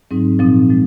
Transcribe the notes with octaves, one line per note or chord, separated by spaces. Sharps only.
G#2 F#3 C4 D#4
A#2 F3 C4 D#4
F3 G#3